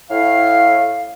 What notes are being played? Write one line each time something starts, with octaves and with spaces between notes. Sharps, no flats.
A2 F5